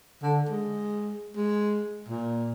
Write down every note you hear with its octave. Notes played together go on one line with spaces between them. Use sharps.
D3
G#3
G#3
A#2